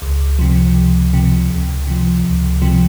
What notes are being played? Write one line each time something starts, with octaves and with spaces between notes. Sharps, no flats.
C#2
C3 F3
C#2
C3 F3
C#2
C3 F3
C#2
C3 F3